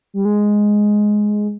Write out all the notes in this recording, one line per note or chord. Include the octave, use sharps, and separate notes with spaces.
G3
G#3